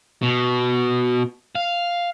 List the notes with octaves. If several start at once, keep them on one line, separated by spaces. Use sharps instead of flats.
B2
F5